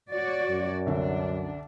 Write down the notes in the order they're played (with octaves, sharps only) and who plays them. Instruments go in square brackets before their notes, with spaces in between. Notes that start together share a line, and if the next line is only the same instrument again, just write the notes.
[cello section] F#4 C#5 D5
[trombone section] F#2
[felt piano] C2 D3 [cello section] D4